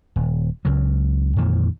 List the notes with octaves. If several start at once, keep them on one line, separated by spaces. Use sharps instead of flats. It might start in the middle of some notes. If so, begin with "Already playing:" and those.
D#1
C#2 C#3 F#3
F2 A#2 D#3 E3